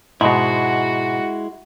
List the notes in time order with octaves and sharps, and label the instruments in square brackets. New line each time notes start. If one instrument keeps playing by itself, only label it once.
[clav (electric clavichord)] G#2 B2 [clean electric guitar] G#3 E4 [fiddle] F#4